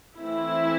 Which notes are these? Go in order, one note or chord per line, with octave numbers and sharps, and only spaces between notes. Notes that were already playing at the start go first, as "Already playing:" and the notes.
E3 A3 C4 E4